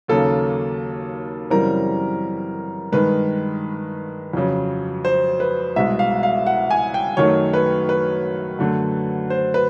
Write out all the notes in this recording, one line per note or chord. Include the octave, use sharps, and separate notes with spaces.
D#2 C#3 F#3 A#3 A4
F#2 C#3 E3 G3 C4 A#4
G2 D#3 G#3 B4
F2 C#3 F#3
C5
B4
C2 B2 G#3 E5
F5
F5
F#5
G#5
G5
F#2 D#3 F#3 A3 C#5
B4
B4
F#2 D3 F#3 A3
C5
B4